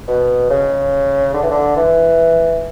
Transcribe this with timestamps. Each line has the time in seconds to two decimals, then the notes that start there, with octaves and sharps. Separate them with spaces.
0.08 B2
0.50 C#3
1.34 D3
1.43 E3
1.50 D3
1.76 E3